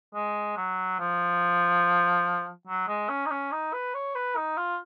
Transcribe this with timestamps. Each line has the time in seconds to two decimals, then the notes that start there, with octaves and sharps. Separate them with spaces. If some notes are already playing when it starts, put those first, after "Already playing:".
0.15 G#3
0.57 F#3
0.99 F3
2.67 F#3
2.88 G#3
3.09 C#4
3.26 D#4
3.31 C#4
3.52 D#4
3.73 B4
3.94 C#5
4.15 B4
4.36 D#4
4.57 F4